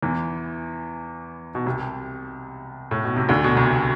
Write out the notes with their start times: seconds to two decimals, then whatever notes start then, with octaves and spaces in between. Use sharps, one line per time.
0.02 E2 E3
1.55 B2
1.66 C2 C3
2.91 A2
3.04 B2
3.16 C3
3.29 D2 D3
3.44 B2
3.56 C2 C3